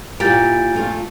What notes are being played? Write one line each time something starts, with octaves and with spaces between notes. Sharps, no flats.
A#2 E4 G4 A#4 G6 A6 D7
A3 F4